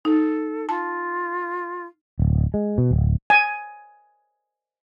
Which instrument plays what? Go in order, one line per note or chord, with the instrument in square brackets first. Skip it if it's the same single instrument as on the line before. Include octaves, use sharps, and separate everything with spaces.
[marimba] D#4 [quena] A4
[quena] F4 [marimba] A5
[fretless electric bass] D1
G#3
B2
D1
[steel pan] G#5